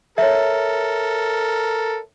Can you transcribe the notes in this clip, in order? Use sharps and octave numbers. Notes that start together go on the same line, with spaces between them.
A4 A#4 C#5 E5